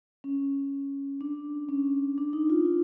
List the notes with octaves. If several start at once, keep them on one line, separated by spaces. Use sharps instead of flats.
C#4
D4
C#4
D4
D#4
F4
D#4